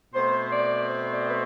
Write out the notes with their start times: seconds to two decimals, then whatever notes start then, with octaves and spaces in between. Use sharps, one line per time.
0.14 B2 A3 C4 C5
0.51 D5
0.89 C5
1.12 D5
1.29 B4